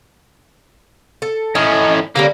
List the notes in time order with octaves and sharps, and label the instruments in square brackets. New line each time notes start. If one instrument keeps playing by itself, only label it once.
[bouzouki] A4
[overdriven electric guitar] A2 C#4 [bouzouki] D#5
[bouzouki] D3 G3 C#4 [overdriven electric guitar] A#3